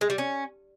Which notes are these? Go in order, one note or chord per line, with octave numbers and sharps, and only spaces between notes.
G#3
G3
C#4